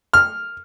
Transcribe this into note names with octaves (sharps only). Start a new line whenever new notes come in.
F6